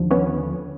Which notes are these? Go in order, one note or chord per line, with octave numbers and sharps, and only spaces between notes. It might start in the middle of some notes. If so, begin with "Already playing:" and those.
Already playing: D#2 D3 F3
B3 C#4